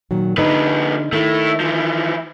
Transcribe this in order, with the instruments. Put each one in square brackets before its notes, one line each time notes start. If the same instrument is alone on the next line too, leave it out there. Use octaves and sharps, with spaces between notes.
[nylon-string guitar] A#2 D#3 F#3
[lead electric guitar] F2 B4 [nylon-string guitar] D3 D#4
[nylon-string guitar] D#3 [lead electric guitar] A3 E4
[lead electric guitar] E3 F3